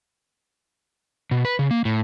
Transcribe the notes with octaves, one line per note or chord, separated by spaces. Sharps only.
B2
B4
C#3
A#3
A2